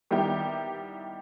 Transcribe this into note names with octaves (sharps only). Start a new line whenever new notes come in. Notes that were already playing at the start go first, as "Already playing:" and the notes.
D#3 G3 B3 E4 G4